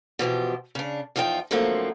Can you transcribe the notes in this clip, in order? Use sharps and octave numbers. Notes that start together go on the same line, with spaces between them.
B2 E3 F3 G4
C#3 D4
E2 F3 D#4 F4 G5
F#2 D3 F3 A3 A#3 C4